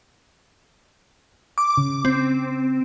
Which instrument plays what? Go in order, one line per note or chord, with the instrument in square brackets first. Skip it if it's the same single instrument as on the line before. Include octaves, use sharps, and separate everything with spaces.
[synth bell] D6
[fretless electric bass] C#3
[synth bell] C4